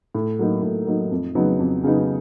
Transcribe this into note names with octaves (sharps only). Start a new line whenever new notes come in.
A2
F#3 A#3 D#4
A2
F#3 A#3 D#4
F2
C#3 F#3 B3 D#4
F2
C#3 F#3 B3 D#4